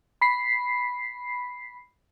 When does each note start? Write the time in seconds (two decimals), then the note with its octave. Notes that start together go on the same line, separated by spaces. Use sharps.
0.21 B5 B6 C7